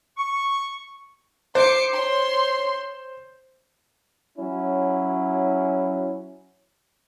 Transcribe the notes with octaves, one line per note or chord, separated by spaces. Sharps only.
C#6
C5 D6 C7 C#7
C#5 C6
F#3 C#4 E4